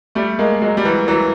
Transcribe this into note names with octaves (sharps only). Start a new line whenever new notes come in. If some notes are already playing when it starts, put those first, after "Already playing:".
G3 A3
G#3 A#3
F#3 G#3
G3
E3 F#3
E3 F#3